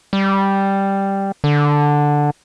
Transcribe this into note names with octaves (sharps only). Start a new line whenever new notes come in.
G3
D3